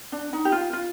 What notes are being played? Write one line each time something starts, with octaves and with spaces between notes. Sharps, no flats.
D4
D#4
G4
F4
F4